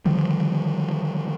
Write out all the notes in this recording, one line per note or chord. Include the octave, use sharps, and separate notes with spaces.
D3 D#3 F3 G3